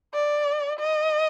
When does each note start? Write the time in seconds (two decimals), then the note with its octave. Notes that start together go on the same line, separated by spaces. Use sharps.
0.14 D5
0.79 D#5